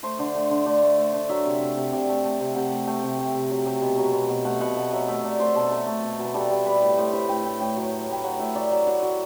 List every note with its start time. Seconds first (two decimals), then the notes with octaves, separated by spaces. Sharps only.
0.03 A3 C5
0.19 D3
0.35 A3
0.50 D3
0.66 A3 D5
0.83 A3
0.98 A3
1.13 D3
1.29 F#3 E5
1.45 C3
1.61 C3
1.77 C3
1.92 C3 D5
2.08 A3
2.24 A3
2.40 C3
2.55 C3 F#5
2.71 A3
2.87 A3 G5
3.03 C3
3.19 C3
3.35 C3
3.50 F#3
3.66 C3
3.82 B2
3.98 F#3
4.14 B2
4.29 B2
4.45 A3 F#5
4.61 B2 F#5
4.77 B2 F#5
4.92 F#3 E5
5.08 A3 E5
5.24 A3 D5
5.39 A3 C5
5.55 B2 A4
5.71 A3 A4
5.87 A3
6.03 B2
6.19 B2
6.25 B4
6.34 G3 A4
6.51 G3
6.66 G3 B4
6.82 A2
6.97 A2 C5
7.13 A2 B4
7.29 A2 G5
7.45 A2 G5
7.60 A2 G5
7.76 F#3
7.92 F#3
8.08 A2 G5
8.24 F#3 F#5
8.39 A2 E5
8.55 F#3 D5
8.71 F#3 E5
8.87 F#3 F#5
9.03 F#3